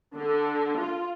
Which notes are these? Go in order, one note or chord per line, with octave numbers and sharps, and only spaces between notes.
D3
F4